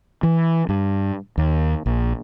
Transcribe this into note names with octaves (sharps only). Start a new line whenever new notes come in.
E3
G2
D#2
A#1